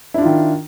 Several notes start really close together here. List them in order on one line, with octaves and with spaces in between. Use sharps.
E4 D4 F4 D#3